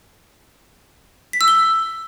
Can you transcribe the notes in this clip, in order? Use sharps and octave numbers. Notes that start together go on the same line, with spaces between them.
B6
E6
G7